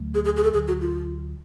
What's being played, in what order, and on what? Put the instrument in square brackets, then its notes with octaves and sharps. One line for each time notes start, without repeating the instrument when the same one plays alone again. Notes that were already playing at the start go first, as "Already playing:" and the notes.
Already playing: [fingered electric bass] D2 D3 F#3 A3
[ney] G#4
G#4
G#4
A4
[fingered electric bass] D2 D3 F#3 [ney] G#4
[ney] F#4
F4